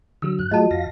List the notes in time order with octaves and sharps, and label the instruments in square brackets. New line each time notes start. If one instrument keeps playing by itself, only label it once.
[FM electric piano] D3 F#3 [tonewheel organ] E6
[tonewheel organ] G2 F#6
[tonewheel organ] F#3 A3 G#4 [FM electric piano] F4 F#4 [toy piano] D#5 A5
[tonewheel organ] F2 F5 A#6